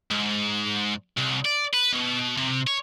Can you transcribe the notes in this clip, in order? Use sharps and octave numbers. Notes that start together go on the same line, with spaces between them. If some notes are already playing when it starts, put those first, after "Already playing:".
G#2
C2
D5
B4
B2
C3
C#5